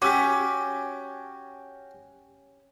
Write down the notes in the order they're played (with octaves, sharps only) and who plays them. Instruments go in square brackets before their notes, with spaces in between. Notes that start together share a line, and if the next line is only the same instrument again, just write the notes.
[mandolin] C#4 [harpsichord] F#4 G4 [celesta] D6 E6 B6